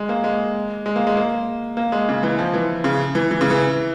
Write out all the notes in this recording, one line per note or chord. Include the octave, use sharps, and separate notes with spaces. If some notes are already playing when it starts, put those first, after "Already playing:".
Already playing: G#3
A#3
G#3
G#3
A#3
G#3
A#3
A#3
G#3
C#3
E3
F3
E3
C#3
E3
E3
C#3
E3